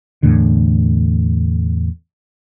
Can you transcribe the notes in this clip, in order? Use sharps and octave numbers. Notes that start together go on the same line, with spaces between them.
E2 A2 D3